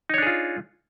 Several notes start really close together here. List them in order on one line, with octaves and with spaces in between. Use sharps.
D#4 C#5 D4 G#4 F4